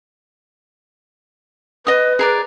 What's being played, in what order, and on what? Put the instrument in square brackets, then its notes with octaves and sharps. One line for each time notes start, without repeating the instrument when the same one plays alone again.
[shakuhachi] B4 [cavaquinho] D#5 D#6
[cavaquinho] G#4 A#4 D5